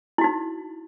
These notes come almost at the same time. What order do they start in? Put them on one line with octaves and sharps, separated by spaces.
E4 F#4 D#4